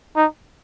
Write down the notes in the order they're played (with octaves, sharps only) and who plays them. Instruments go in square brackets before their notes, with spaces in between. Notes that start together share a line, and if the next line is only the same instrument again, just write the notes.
[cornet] D#4